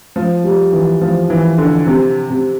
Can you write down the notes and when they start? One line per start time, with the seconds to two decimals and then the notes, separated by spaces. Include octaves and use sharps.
0.16 F3
0.44 G3
0.73 E3
1.01 F3
1.30 E3
1.58 D3
1.87 C3
2.30 C3